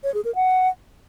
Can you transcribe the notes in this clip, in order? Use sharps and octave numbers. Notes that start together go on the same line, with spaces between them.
C#5
G#4
A#4
F#5